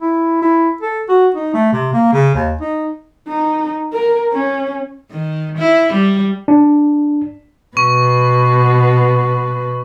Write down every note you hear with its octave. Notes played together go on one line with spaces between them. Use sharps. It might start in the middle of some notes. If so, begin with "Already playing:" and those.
E4
E4
A4
F#4
D#4
A3
C3
A#3
C#3
D#2
D#4
D#4
A#4
C#4
D#3
E4
G3
D4
B2 B4 C#6